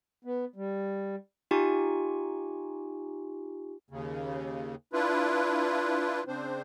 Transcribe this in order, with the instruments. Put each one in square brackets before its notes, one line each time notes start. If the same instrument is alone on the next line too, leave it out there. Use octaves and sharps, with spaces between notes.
[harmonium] B3
G3
[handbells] D#4 F4 G4 G#5 C#6
[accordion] D#2 C#3
D4 E4 F4 B4
C#3 C4 D4 C5